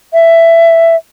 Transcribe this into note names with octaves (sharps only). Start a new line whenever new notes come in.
E5